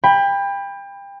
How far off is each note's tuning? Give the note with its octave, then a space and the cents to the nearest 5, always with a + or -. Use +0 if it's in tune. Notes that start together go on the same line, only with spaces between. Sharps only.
G5 +30 B5 +0